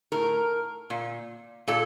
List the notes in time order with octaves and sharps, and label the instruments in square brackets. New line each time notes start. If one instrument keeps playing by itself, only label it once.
[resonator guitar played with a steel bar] A2 A#4
A#2
A#2 A4